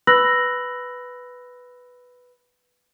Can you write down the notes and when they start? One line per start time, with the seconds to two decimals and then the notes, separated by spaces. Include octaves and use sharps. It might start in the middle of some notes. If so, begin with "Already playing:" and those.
0.07 B4 B5 E6 F#6 A#6 F#7